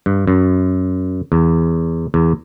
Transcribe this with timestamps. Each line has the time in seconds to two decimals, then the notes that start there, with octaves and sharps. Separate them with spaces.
0.06 G2
0.27 F#2
1.32 E2
2.14 E2